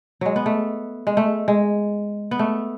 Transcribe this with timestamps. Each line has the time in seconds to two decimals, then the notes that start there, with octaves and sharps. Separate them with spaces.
0.21 F#3 G#3
0.36 B3
0.46 A3
1.07 G#3
1.17 A3
1.48 G#3
2.31 B3
2.39 A3